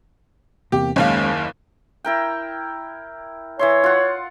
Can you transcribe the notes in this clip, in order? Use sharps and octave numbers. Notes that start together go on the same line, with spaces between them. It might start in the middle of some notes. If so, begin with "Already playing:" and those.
E2 C3 A#3 G4
F#1 D#2 G#3 A#3 C#4 F5
E4 A#4 G5
E3 C#5 E5 C6
F4 F#5